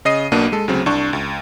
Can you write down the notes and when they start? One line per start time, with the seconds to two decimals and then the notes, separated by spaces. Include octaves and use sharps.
0.05 C#3 D#5 C7 D#7
0.32 B1 B2 A#3 D4 D#7
0.52 G#3 A4
0.68 D2 C#3 F#3 C4
0.86 C2 D4 C#6
1.13 C#2